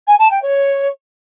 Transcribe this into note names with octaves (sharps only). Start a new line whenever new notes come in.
G#5
A5
G5
C#5